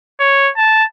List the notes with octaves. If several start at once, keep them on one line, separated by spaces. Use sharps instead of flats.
C#5
A5